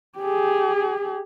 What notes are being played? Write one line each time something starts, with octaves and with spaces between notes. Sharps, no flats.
G4 G#4